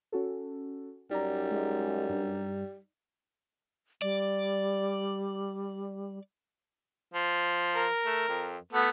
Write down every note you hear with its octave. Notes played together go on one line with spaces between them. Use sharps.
C#4 F#4 A4
F#2 G3 D#4 D5 A#5
G#3
G2
G3 D5
F3
A#4
A3
F2
A3 B3 F#4